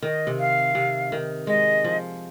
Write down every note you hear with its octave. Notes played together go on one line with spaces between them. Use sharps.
D#3 D#5
C3
F5
C3
D#3
G#3 D#5
F3